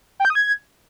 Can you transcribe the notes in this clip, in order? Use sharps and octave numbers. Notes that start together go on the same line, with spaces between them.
G5
G6
D#6
G#6